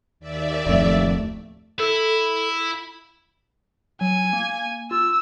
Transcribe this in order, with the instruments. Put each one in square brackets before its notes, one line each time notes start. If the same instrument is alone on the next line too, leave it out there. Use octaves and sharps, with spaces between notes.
[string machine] D#2 D5 E5
[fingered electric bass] D1 F2 [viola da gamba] A3
[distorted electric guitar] E4 [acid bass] A4
[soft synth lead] F#3 [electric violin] G#5
[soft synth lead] A#3
[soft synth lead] F4 [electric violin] E6